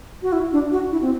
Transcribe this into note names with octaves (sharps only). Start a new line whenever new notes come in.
F#4
E4
D4
F#4
E4
C4